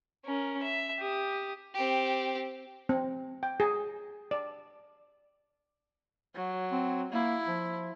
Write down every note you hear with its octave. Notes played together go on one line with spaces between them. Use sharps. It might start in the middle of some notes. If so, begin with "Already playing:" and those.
C#4 A#4
E5
G4 D#6
C4 G4
C4
G5
G#4
D5
F#3
C4
A#3 E4
F3